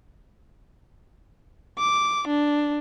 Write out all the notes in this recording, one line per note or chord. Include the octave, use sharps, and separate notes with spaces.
D6
D4